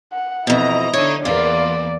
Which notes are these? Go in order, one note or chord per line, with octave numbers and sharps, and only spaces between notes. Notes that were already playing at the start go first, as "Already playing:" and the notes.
F#5
F2 B2 E3 E4 D#5 A#5
D3 D#4 C#5
E2 E3 A#3 F4 D5